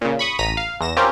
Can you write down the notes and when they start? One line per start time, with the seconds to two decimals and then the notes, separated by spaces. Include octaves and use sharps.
0.01 A#2 C#3
0.19 B5 C#6 D#6
0.39 A1 A#5 B6 D#7
0.57 F5
0.81 E2 A#6 E7
0.97 C4 C#4 F4 G4 A#4